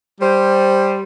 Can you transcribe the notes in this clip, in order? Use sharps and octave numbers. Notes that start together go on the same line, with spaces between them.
G3 C5